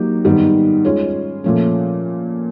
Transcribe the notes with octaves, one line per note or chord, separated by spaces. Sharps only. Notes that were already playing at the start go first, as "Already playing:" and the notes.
Already playing: F#3 A#3 D#4 G4
G#2 D#3 G3 B3
G#3 C#4 F4 G#4 C#5
A#2 F3 A3 C#4